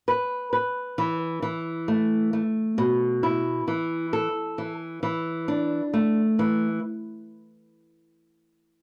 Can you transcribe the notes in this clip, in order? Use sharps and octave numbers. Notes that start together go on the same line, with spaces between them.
B4
B4
E3
E3
A3
A3
B2
E4
E3
A4
E3
E3
D4
A3
E3